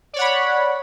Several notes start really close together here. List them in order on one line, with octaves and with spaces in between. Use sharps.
D5 C#5 F#5 B5